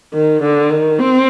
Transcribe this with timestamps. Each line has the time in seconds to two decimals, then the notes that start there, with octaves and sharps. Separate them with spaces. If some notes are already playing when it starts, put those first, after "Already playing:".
0.13 D#3
0.43 D3
0.70 D#3
0.99 C4